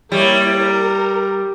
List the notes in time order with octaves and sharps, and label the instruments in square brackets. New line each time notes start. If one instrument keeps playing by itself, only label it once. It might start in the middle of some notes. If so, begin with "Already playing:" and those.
[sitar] G3 [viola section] A#3 E4 C#5
[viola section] A#4